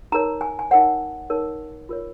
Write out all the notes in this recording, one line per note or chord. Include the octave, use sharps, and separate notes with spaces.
D#4 A#4 C#5 A#5
G#5
G#5
D#4 A#4 C#5 F#5
D#4 A#4 C#5
F4 A#4 C#5